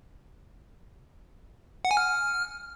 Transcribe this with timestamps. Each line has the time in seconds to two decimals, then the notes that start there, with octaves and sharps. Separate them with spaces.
1.85 F#5
1.91 G#5
1.97 F6